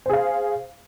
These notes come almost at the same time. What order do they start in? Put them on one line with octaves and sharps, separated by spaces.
C5 G#4 F5